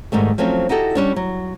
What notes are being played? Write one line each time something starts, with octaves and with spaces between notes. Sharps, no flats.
G#2 D#3 G3 A3
F3 F#3 A3 C4 C#4
D#4 E4 F#4 G4 A4
G3 C#4 D4
F#3